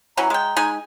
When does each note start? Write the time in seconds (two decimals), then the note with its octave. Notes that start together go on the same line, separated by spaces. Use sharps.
0.17 E3 F#3 C#4 A#5
0.30 G#3 G5
0.56 G#3 D#4 G#5